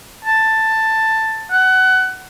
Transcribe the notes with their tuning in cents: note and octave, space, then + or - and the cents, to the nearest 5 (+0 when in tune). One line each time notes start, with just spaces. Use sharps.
A5 +10
F#5 +20